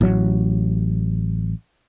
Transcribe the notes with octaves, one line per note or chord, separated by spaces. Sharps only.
A1 F#3